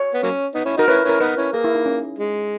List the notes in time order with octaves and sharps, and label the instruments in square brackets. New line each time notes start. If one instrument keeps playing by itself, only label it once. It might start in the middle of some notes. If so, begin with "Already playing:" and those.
Already playing: [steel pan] C#5
[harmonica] B3
F#3 A#3 C#4
B3 D#4
C#4 E4
[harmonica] D#4 F#4 [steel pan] A#4
[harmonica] C#4 E4 [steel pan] B4
[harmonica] C#4 E4 [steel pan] A#4
[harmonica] B3 D#4 [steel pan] B4
[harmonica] C#4 E4
[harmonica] A#3 [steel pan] G#4
[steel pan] E4
D#4
C#4
[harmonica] G#3